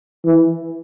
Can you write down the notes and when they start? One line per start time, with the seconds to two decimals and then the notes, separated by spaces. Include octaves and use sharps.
0.25 E3